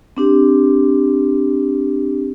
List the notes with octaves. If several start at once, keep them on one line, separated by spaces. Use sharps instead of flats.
C4 D4 G4